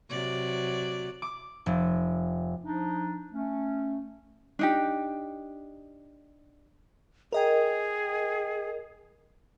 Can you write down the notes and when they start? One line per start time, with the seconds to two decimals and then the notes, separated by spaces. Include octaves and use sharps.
0.10 C3 F#3 D5
1.22 D6
1.66 F1
2.64 F3 D4 D#4
3.32 A3 C#4
4.59 D4 D#4 G4
7.32 G#4 A#4 D#5 G5